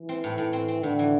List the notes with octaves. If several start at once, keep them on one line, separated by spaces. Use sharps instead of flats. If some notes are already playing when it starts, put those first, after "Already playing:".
Already playing: E3
C4
A2
A2
C4
C4
A2 D3
E3